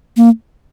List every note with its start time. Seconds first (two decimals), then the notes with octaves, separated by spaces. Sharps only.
0.17 A#3